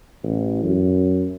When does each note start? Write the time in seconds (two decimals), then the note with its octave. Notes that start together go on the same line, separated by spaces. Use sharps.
0.23 A1
0.64 F#2